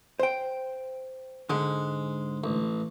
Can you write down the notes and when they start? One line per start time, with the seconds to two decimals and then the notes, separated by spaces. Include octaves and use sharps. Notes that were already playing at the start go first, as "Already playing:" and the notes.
0.20 C5 G5
1.50 G#2 D3 G#3
2.44 A1